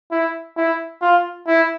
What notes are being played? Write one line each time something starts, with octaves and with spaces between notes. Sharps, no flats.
E4
E4
F4
E4